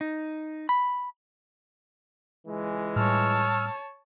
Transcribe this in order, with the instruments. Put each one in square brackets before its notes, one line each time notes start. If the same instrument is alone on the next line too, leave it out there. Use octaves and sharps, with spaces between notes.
[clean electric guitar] D#4
B5
[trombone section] C#2 E3 G#3
[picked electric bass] A2 G3 [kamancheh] C#5 A5 [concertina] E6 F6